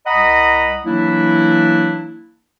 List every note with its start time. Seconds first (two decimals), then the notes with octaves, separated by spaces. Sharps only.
0.05 C2 D#5 F#5 A#5 B5 D#6
0.84 E3 F#3 A#3 D4 E4